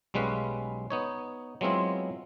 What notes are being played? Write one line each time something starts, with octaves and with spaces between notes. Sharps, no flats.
B1 G3 G#3 C#4 B4 F5
B3 D#4 C#5
F#3 G#3 B3 C4 E4 F4